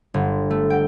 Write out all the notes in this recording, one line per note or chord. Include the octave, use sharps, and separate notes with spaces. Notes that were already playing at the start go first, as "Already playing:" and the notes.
G1
A3
G5